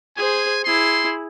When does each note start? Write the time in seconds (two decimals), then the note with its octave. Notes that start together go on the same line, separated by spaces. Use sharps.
0.17 G#4 C5 G#5
0.64 E4 G#4 C6